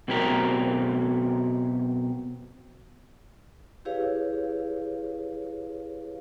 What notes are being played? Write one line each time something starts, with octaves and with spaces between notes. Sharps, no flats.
B2 F#3 C4 G4 A#4
E4 G4 G#4 B4 C#5 F5